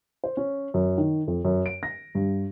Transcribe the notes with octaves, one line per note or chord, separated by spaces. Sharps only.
C5
C#4
F#2
D#3
F2
F#2
D7
A#6
G2